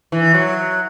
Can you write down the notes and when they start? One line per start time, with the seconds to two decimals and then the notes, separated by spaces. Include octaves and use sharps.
0.12 E3
0.34 F#3